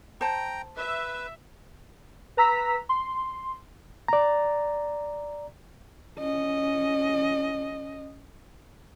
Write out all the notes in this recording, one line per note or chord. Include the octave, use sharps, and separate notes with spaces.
C5 G5 A5 A#5
B4 E5
B4 A#5 E6 B6
C6
D5 A#5
C#4 D#5